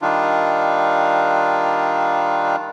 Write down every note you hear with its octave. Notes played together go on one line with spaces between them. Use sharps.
D#3 G3 D4 D#4 F4